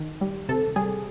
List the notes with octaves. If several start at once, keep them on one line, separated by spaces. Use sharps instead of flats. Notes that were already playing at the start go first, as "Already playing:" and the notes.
Already playing: D#3
G3
C3 A4
G3 G#4